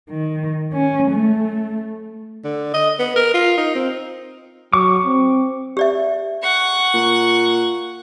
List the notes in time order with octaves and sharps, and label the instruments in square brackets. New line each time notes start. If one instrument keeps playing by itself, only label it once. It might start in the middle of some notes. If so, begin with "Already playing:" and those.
[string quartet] D#3
C#4
A3
[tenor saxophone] D3
D#5
B3
A#4
F4
D#4
C4
[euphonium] F#3 [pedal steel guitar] C#6 D6
[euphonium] C4
[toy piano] G4 D5 E5
[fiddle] F#5 C#6
[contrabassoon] A#2